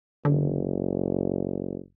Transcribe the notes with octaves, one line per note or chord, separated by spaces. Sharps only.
F#1 D3